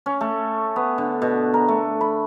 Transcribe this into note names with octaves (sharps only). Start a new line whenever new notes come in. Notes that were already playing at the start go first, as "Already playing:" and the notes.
C#4
A3
B3
D3
B2
A#4
A3
B5